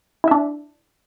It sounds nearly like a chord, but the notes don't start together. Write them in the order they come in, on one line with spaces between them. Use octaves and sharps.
E4 E5 D4